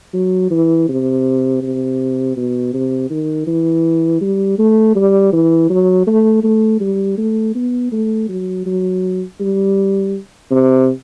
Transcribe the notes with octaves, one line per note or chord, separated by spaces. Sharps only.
F#3
E3
C3
C3
B2
C3
D#3
E3
G3
A3
G3
E3
F#3
A3
A3
G3
A3
B3
A3
F#3
F#3
G3
C3